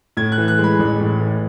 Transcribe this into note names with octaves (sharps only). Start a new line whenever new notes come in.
A2 G#6
F#6
E3
F#6
G#3
B5
A1
A2
E3